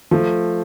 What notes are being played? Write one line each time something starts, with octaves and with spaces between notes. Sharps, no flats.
F3 A3